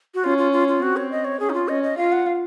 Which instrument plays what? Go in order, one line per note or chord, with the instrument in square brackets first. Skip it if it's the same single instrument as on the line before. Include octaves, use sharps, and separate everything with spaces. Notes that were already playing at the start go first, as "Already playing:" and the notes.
[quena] F#4
[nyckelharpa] C#4 [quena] F4
[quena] F4
F4
F4
[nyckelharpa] C4 [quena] F#4
[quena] C#5
D#5
C#5
[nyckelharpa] C#4 [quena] G#4
[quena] D#4
F4
[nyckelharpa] C#4 [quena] D#5
[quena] D#5
[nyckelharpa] F4 [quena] F5
[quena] F#5
F5